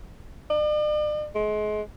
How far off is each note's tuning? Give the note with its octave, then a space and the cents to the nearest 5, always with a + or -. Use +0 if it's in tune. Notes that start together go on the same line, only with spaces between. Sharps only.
D5 +45
G#3 +30